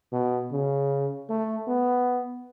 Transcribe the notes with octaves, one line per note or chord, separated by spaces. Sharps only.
B2
C#3
A3
B3